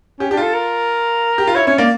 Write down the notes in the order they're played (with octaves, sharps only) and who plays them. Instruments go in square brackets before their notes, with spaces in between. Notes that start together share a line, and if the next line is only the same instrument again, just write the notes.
[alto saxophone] C#4 [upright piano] G4
[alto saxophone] D4 [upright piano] G4
[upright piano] F4 [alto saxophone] A4
[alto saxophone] A#4
[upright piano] G4
F4
[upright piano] E4 [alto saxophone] C#5
[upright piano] C#4 [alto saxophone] C#5
[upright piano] A#3 [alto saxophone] D5